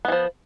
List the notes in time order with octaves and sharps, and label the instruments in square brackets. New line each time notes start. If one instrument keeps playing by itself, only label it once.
[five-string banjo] B3
E3
F3